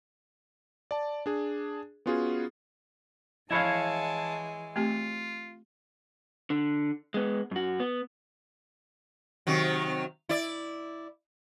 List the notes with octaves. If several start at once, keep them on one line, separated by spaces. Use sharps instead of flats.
D5 A5
D4 G#4
B3 C#4 F4 F#4 G#4
E3 F3 G#3 E4 C#5 F5 A5 B5
A3 C4 F4 G4
D3
G#3 B3
F#2 F#4
B3
C3 D#3 F#3
E4 D5